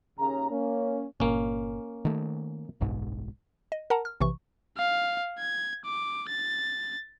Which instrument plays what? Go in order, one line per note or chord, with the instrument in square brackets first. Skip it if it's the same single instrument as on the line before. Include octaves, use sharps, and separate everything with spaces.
[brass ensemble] D#2 C#3 A#5
A#3 C#4
[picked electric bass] G1 A#2 [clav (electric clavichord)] A#3 C#4
[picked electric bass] D#3 A3
F#1 B1 G#2
[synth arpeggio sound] D#5
A#4 F#5 A5 A#5
F6
A#1 C3 E3 C#6
[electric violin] F5
G#6
D6
A6